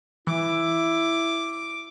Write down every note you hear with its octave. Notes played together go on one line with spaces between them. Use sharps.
E3 E4 D6